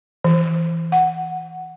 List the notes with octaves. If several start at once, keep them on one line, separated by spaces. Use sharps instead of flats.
E3
F#5